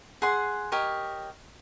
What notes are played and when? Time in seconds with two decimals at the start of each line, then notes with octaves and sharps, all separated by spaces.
0.22 G#4 F#5 C6
0.72 G4 A#4 C#5 D#5